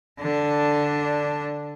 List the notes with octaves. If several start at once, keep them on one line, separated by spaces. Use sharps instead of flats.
D3 D4